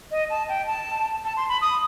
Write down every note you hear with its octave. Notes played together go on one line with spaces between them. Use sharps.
D#5
A5
G5
A5
A5
C6
B5
D#6